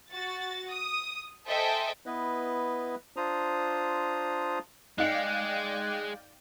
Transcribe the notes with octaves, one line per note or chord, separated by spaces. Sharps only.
F#4 A6
D#6
A4 C5 D#5 E5 G5 G#5
B3 E4 B4 D#5
D4 F4 C5 A#5 D#6
G#3 D#4 D5 F5 G5 F#6 C#7